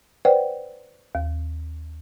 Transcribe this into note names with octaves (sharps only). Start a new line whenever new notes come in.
B4 C5 D5 F#5 G5
D#2